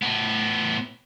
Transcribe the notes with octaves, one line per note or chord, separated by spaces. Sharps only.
A2 B3